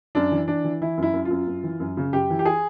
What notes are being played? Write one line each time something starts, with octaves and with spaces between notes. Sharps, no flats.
F#2 D4
E3
E3 D4
E3
E3 E4
F#2 E4
F#2
F4
F#2
F#2
E3
F#2
C#3
F#2 G4
E3
G4
G#4